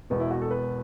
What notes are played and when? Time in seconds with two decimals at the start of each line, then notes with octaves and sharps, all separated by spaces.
0.10 E1 E2 B2 B3
0.20 E4
0.31 F#4
0.41 A4
0.51 B4